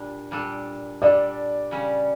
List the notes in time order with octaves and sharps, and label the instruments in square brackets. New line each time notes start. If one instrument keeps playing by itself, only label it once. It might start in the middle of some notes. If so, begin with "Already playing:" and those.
Already playing: [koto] A#2 G3 D4
A#2 G3 D4 A4
[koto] A#2 G3 D4 A4 [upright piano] D5
[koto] C#3 G3 C#4